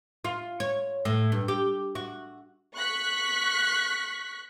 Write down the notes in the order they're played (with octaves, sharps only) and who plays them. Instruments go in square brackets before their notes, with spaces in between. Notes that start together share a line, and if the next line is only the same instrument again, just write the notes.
[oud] F4
C#5
A2
G2
G4
F#4
[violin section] C#6 F#6 B6